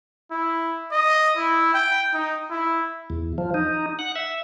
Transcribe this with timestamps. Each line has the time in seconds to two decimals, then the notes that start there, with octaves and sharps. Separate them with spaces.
0.31 E4
0.91 D#5
1.37 E4
1.74 G5
2.13 D#4
2.50 E4
3.10 E2
3.38 F3
3.54 D#4
3.99 F#5
4.16 E5